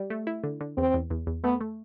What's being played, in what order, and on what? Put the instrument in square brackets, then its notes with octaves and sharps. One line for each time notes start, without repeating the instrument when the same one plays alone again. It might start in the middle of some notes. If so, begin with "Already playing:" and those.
Already playing: [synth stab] G3
A3
E4
D3
D3
[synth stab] E2 [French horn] C4
[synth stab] E2
E2
E2
[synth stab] A3 [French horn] B3
[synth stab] A3